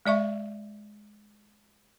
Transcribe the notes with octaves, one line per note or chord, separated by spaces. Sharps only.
G#3 D5 E5 C#6